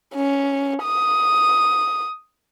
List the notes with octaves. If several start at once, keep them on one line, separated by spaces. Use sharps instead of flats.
C#4
D#6